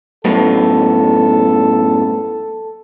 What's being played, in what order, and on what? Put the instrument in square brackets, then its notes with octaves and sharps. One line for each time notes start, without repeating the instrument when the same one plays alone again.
[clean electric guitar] F#2 A2 B3 [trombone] A4